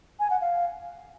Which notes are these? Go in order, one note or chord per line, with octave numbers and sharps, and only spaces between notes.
G#5
F#5
F5